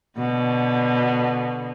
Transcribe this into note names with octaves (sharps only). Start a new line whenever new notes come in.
B2 D3